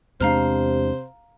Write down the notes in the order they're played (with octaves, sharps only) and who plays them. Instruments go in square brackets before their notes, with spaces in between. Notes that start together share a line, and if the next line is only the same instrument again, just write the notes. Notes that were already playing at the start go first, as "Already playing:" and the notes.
[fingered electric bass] E2 G#3 D4 [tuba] C3 [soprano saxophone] C5 [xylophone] F5 A#5 F6